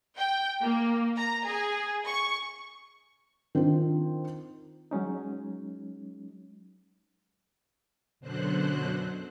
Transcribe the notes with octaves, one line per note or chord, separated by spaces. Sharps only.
G5
A#3
A#5
G#4
C#6
D#3 C4 D4 F4
F#3 G#3 C#4 D#4
F#2 B2 D3 F#3 C5 F#6